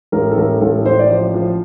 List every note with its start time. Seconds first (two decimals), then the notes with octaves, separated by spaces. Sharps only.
0.12 A1 A#4
0.31 A4
0.37 A1 A#4
0.61 A1 A4
0.85 A1 C5
0.99 D5
1.10 F3 C5
1.34 F3